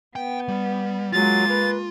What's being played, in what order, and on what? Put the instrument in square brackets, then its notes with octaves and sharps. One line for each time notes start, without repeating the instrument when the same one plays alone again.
[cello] B3 [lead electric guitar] G5
[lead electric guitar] G3
[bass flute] F#3 [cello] G#3 A#3 [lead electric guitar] F4 [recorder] A6
[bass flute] B4